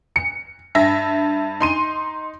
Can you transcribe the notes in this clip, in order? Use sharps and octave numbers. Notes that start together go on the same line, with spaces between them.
C#7
G2 E5 A#6
D#4 C6 D#7